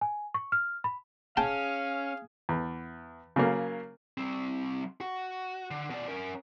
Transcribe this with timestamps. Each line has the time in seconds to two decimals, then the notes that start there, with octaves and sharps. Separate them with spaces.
0.01 G#5
0.34 C#6
0.52 F6
0.84 B5
1.37 C#4 G#4 F5 G5 A5
2.49 E2
3.36 C#3 F#3 A#3
4.18 G3 C4
5.00 F#4
5.71 D3
5.90 B2 D5
6.08 C#4 A#4